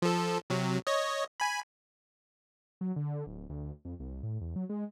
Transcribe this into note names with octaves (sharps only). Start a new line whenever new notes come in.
F3 A4
C3 F#3
C#5 D#5
G#5 B5
F#3
D3
D1
D2
F2
C2
A2
E2
F#3
G#3